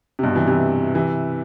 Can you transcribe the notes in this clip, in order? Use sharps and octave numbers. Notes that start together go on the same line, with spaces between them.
C3
G2 B2
C3 E3
C3 E3
C3 E3